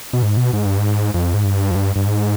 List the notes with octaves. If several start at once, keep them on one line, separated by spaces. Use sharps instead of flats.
B2
G#2
B2
G#2
G2
G#2
F2
G#2
G2
F2
G2
G2
G#2